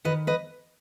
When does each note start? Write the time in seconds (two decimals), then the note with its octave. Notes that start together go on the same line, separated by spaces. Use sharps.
0.05 D#3 B4 D#5
0.27 B4 D#5